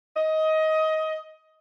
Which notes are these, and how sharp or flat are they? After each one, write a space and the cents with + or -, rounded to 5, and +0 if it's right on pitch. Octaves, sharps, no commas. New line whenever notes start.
D#5 +20